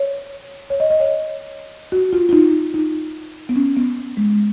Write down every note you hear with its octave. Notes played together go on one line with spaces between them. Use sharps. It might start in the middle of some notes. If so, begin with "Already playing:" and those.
Already playing: C#5
C#5
D#5
D#5
C#5
F#4
F4
F4
D#4
D#4
B3
C#4
B3
G#3